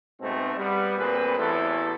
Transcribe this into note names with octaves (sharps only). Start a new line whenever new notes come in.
G#2 B2 A3 C4
G3 B3
D2 A#2 C4 G#4 B4
A1 E2 E3 A3 E4 A4